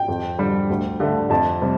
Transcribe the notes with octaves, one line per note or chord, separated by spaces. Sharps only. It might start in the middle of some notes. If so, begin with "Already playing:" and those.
Already playing: G5
F2
D3 G3
D2
D3 A3
F2 A5
C3 G3